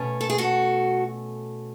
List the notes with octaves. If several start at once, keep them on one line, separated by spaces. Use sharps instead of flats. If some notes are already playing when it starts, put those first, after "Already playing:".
Already playing: B2 A3 C#4
A4
G#4
F#4 A4